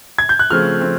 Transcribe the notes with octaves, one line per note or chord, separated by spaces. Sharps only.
G#6
G6
F#6
C#3 F3 A3 C4 F6
F3 A3 C4